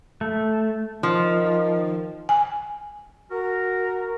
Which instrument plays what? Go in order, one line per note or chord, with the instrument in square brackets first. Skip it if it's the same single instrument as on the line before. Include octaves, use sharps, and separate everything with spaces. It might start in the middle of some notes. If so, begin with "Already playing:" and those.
[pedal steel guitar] A3
[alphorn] D#3 [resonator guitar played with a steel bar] F3
[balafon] G#5
[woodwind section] F#4 A#4